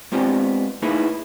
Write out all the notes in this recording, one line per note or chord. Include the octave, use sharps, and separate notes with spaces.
G#3 B3 C4 D4 F4 G4
A3 A#3 D#4 E4 G#4 B4